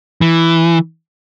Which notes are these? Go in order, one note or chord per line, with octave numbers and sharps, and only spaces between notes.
E3